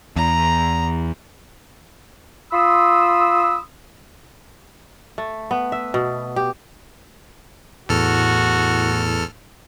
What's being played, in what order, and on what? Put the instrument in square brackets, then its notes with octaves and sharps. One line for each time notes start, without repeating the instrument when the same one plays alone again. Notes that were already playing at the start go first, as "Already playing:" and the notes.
[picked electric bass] E2 [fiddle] A#5
[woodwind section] F4 B5 C6 D#6 E6
[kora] A3
B3
E5
B2
G4
[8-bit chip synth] E2 A4 F6 [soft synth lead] A2 [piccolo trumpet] F#4